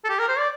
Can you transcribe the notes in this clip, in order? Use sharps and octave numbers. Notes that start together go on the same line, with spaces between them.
A4
G4
A#4
C5
D5